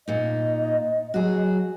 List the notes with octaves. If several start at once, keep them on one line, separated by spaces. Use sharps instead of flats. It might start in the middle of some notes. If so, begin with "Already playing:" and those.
A#2 D#4 D#5
F#3 F#4 G#4